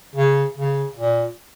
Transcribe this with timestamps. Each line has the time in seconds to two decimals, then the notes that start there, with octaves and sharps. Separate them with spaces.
0.15 C#3
0.56 C#3
0.96 A#2